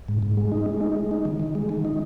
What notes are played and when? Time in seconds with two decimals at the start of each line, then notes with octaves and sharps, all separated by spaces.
0.08 G#2
0.23 G#2
0.37 G#3
0.52 D#4
0.66 G#3
0.81 D#4
0.96 G#3
1.11 D#4
1.25 D#3
1.40 D#3
1.55 G#3
1.69 D#3
1.85 D#4